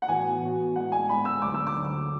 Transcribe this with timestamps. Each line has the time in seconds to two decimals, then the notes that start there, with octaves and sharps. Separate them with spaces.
0.02 F#5
0.08 A2 E3 B3 F#4 G#5
0.41 A2 E3 B3 F#4
0.75 A2 G#3 B3 F#5
0.92 G#5
1.09 A2 G#3 B3 B5
1.25 E6
1.42 D2 D3 F#3 D6
1.54 E6
1.67 D6
1.75 D2 D3 F#3